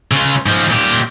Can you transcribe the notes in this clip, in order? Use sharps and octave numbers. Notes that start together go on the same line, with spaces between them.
C#3 F4
G#2 F3
A#2 G4